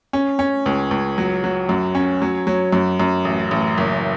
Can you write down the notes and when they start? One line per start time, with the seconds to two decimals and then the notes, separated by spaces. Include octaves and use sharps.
0.13 C#4
0.39 C#4
0.66 C#2
0.91 C#2
1.18 F#3
1.44 F#3
1.69 F#2
1.95 C#4
2.22 F#3
2.47 F#3
2.73 F#2
3.00 F#2
3.25 A1
3.51 A1
3.78 F#1